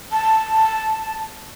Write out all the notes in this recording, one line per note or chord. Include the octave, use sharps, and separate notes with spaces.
A5